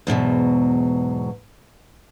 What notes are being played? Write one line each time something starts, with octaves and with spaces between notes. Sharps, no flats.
E2 G#2 B2 F#3